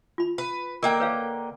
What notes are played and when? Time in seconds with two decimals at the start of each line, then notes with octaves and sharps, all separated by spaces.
0.18 F4 B5
0.38 B4
0.83 D3 A#3 A#4 D#5 G5 D6
1.00 B4 C#5 F5